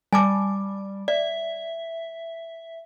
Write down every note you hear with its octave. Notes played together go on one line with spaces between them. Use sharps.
G3 G#5 A5 D6
D5 E5